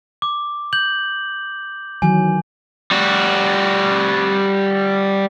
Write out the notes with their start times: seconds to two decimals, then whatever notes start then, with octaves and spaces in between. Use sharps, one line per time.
0.22 D6
0.73 G6 F#7
2.02 D#3 E3 F#3 G#5
2.91 G3 F#4